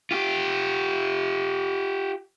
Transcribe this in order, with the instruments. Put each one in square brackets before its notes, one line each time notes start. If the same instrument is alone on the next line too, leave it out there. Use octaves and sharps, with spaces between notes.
[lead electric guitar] F4 G4